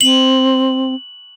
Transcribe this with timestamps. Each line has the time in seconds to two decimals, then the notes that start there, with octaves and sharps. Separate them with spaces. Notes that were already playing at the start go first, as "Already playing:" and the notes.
0.01 C4 F#7